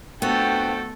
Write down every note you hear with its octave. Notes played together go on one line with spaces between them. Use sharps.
F2 A3 B3 D4 F#4 A4 G5